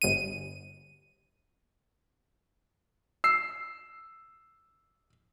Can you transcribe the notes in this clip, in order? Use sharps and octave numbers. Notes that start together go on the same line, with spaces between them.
G1 D#7
E6 C7